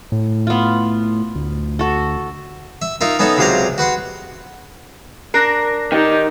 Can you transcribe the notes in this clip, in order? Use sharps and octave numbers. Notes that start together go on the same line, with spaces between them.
A2
B3 F4
D2
F#4 A4
E5
D#4 F4 A#4 E5
B3 C#4 D#4 A4 E5
C#2 C3 F#3 C5 F5 A#5
F#4 B4 F#5 C6
D4 A#4 F#6 A#6 C7
D#3 D#4 G4